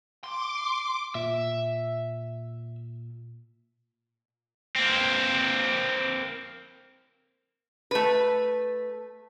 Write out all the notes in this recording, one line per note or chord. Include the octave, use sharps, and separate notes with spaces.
C6 D6
A#2 E5
A#3 C4
A3 B4